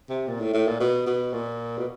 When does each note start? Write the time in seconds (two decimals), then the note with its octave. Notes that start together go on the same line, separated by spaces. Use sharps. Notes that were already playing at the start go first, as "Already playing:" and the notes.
0.10 C3
0.28 A#2
0.41 A2
0.54 A2
0.67 A#2
0.80 B2
1.07 B2
1.33 A#2
1.78 B2